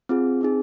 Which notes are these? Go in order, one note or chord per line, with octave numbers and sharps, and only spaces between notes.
C4 F4 G#4
C4 D#4 G#4